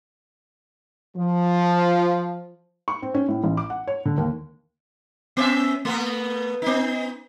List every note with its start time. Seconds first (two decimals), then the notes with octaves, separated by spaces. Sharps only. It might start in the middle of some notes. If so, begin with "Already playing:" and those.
1.15 F3
2.88 C#6
3.02 C4
3.14 C#4
3.28 A2
3.44 A1
3.57 D6
3.70 F#5
3.87 C#5
4.06 D3
4.18 D#2
5.37 B3 C#4 E5
5.85 A3 B3
6.62 B3 D#4